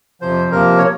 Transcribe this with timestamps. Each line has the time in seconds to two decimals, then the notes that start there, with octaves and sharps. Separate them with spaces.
0.21 F2 C3 F3 C5
0.52 C3 F3 A#3 A#4
0.78 C#5